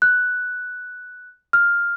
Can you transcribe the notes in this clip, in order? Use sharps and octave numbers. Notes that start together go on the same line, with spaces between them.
F#6
F6